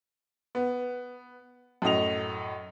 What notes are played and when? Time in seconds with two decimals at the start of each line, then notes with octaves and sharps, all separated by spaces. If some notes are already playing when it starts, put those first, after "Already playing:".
0.55 B3
1.82 F#2 A2 D#5 F7